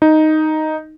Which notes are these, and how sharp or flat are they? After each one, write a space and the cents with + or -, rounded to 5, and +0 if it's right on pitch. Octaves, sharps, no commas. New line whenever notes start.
D#4 +0